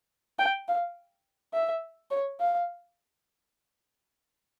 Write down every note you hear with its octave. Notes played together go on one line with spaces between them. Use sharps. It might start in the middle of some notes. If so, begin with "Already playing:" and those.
G5
F5
E5
C#5
F5